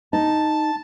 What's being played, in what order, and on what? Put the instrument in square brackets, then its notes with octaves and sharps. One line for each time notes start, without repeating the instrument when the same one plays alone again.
[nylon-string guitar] D#4 [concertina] A5